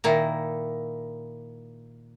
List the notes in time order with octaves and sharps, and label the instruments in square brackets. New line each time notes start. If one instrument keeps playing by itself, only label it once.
[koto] A#2 D#3 E4